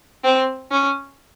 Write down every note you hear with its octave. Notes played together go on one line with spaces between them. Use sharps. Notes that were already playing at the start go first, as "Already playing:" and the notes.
C4
C#4